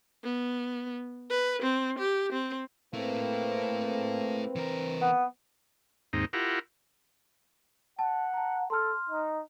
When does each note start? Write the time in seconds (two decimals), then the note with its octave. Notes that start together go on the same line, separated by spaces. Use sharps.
0.23 B3
1.30 B4
1.62 C4
1.99 G4
2.32 C4
2.94 A3 A#3 C4 E4 B4
4.56 E3 A#4
5.01 B3
6.13 D#2 G#2 C4 D#4
6.33 E4 F4 G4 A#4 F#5
7.99 F#5 A5
8.34 A5 A#5
8.70 A4 C6 F6
9.09 D#4